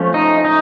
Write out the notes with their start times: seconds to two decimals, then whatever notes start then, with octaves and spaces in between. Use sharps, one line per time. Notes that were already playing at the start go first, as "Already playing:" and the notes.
Already playing: F3 A3 C#4
0.14 D#4
0.45 D#4